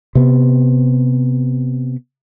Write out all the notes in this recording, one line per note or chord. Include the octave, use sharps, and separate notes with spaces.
C3 B3